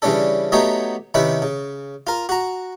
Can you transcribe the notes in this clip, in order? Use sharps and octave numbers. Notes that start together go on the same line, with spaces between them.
C#3 E3 G3 C#4 D4 A4
F#3 A3 B3 D#4 G4 C#5
C3 D#3 C#4 E4 B4
C#3
F4 A#4
F#4 A#5